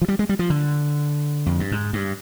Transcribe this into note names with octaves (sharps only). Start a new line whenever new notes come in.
F3
G3
G#3
G3
F3
D3
F2
G2
G#2
G2